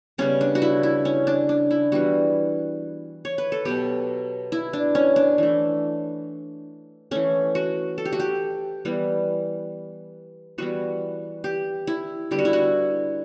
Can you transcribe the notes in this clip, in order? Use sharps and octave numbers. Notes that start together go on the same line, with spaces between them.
C#3 G3 B3 C#4
D4
F#4
E4
E4
C#4
D4
D4
E4
E3 G3 B3 F#4
C#5
B4
A4
B2 F#3 B3 G4
E4
D4
C#4
D4
E3 A3
E3 A3 C#4
F#4
A4
G4
F#4
G4
E3 G3 B3
E3 G3 B3 F#4
G4
E4
D3 G3 B3 G4
F#4
E4
F#4